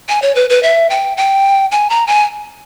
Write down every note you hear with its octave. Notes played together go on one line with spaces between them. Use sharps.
G#5
C#5
B4
B4
E5
G5
G5
G#5
A#5
G#5